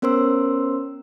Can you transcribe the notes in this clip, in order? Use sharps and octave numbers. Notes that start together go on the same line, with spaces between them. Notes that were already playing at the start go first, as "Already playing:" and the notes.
B3 C#4 A#4 C5 C6 E6